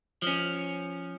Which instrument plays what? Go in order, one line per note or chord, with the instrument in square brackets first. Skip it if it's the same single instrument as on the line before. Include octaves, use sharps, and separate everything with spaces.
[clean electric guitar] F3 C#4